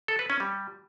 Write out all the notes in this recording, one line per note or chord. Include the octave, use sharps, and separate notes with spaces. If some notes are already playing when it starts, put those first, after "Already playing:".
A4
B4
C#4
G3